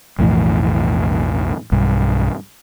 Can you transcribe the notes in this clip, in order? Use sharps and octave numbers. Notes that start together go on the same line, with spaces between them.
B1 F2 A2 E3
B1 G2